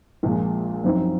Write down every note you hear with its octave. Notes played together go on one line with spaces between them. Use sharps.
A#1 A#2 G#3
F#2 F3 C4 D#4